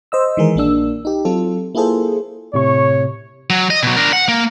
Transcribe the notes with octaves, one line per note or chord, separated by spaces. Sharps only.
C5 D#5 E6
D#3 E3 G#3 G#4 A#4
A#1 A#3 D4 E6
D#4 G4
F#3 C4 F4 A4
A#3 E4 F4 G#4 A4 C5
A2 C3 C#5 C#6
F#3
D#5
B2 F#3
D4 A#4
F#5
A#3